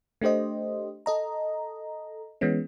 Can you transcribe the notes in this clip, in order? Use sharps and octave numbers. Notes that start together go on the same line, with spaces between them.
A3 D4 G4 C5 D#5
A4 D#5 A#5
E3 G#3 B3 C#4